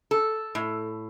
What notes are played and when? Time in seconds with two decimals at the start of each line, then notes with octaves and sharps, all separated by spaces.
0.11 A4
0.55 A2